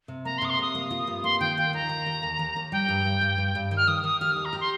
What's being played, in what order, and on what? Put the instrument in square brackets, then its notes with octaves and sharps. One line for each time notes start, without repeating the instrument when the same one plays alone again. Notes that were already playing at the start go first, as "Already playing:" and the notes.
[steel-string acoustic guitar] C3
[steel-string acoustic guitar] A#3 [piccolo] A#5
[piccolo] C6
[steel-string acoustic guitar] C3 [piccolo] D#6
[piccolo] C6
[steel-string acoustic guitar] C3 [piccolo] D#6
[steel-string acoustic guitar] A#3
F4
G2
[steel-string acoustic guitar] A#3 [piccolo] C6
[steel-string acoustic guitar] D#3 [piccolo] G5
[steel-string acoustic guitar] F4 [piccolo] G5
[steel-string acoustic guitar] D#2 [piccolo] A#5
[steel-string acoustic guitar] D#3
D#2
D#2
D#2
D#2
[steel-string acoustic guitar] G3 [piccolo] G5
[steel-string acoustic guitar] G2
G2
G2
G2
G2
D#3
[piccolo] F6
[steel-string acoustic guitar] D#3 [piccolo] D#6
[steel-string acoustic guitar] D#3 [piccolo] D#6
[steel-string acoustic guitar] G4 [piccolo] F6
[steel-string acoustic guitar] D#2 [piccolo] D#6
[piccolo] A#5
[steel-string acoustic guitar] G4
[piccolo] C6